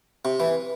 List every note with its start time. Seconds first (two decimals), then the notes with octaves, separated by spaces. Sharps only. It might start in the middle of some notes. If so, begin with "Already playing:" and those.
0.25 C3
0.40 E3